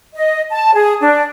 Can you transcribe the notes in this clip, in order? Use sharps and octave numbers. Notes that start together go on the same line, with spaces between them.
D#5
A5
G#4
D4